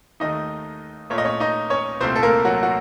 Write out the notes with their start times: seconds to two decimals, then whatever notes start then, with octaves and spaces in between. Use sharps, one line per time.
0.20 D#2 D#3 A3 D#4 D#5
1.10 A#2 A3 C#5
1.18 D#5
1.24 C#4 C#5
1.40 D#4 D#5
1.70 C#4 C#5
2.00 C2 A#2 A3 C4 C5
2.16 A4
2.23 A#3 A#4
2.45 F#3 F#4
2.63 F#4